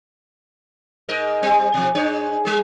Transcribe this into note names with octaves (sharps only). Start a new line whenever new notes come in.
G#2 A#4 D#5
G3 C4
B2 F3
G#2 D4 C#5
G3 G#4